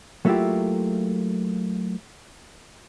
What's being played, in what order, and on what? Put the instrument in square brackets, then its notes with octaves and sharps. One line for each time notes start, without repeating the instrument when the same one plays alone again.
[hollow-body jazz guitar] F#3 A3 A#3 E4 F4 G4